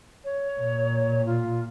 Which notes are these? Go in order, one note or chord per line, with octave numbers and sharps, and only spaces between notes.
C#5
A#2
F4